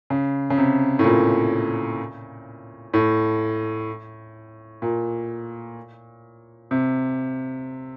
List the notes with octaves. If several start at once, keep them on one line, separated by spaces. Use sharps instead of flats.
C#3
C#3
C3
A2
A#2
A2
A#2
C3